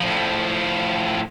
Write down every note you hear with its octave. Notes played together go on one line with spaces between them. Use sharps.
A2 F3